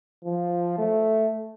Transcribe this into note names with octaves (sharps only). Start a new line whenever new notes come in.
F3
A3